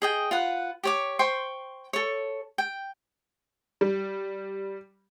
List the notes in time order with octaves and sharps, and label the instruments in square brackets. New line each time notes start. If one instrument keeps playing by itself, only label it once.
[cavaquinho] G#4 D#5 G5
F4 B4 F#5
G4 C#5 D6
C5 G5 C6 C#6
A4 C#5
G5
[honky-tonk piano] G3